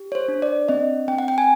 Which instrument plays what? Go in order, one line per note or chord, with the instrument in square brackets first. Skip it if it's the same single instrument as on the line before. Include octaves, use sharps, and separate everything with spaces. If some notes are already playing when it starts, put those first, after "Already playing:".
Already playing: [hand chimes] G4
C#5
C5
D4
D5
C4 D#5
C4 G5
F#5
G5
G#5